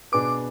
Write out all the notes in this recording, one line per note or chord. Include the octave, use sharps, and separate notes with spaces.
B2 B3 D4 G#4 B4 D6